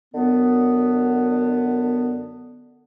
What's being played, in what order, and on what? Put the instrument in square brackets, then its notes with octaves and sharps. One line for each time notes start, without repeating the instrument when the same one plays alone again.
[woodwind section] F#2 D3 B3